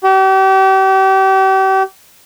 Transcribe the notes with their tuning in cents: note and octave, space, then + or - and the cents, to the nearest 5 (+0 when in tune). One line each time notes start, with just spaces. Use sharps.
G4 -40